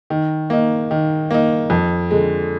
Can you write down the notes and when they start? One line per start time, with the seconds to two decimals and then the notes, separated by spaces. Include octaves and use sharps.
0.10 D#3
0.50 A#3 D#4
0.91 D#3
1.31 A#3 D#4
1.70 F2
2.11 D3 G#3